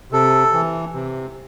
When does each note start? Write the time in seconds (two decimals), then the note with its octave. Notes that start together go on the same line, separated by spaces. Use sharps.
0.12 C3 A4
0.53 E3
0.93 C3